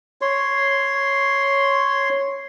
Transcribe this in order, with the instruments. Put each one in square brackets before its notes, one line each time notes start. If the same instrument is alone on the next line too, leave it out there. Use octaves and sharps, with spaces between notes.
[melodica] C#5 C6